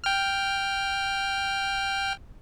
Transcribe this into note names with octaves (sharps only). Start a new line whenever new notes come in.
G5 F6